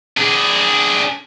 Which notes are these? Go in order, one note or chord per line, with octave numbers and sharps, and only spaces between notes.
D4 G#4